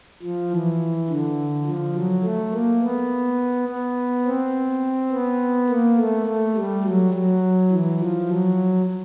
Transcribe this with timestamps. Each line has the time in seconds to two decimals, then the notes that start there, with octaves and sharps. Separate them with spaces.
0.23 F3
0.52 E3
1.10 D3
1.66 F3
1.96 F#3
2.24 A3
2.53 A#3
2.83 B3
3.69 B3
4.26 C4
5.12 B3
5.69 A#3
5.98 A3
6.27 A3
6.56 G3
6.85 F#3
7.14 F#3
7.71 E3
8.00 F3
8.29 F#3